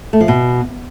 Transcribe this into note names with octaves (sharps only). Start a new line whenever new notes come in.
A3
F3
B2